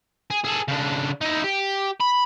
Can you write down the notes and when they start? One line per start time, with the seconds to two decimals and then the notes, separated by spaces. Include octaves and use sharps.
0.31 G#4
0.45 G#4 A4
0.68 C#3 D4
1.21 D#4 E4
1.44 G4
2.00 B5